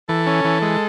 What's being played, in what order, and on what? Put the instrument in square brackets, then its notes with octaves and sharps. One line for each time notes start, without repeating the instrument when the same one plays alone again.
[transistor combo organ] E3 [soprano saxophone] A4
[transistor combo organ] C#4
E3
G#3